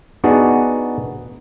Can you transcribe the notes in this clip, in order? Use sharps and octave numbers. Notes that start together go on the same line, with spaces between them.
B3 D4 D#4 F#4 G#4